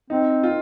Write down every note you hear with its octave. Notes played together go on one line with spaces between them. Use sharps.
C4 D#4
F4